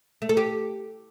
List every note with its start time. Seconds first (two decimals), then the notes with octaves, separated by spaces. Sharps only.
0.22 A3
0.29 A4
0.37 G4